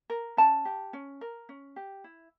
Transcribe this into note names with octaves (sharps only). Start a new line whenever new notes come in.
A#4
C#4 A5
G4
C#4
A#4
C#4
G4
E4